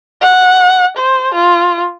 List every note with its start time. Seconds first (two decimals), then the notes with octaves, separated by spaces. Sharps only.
0.21 F#5
0.97 C5
1.34 F4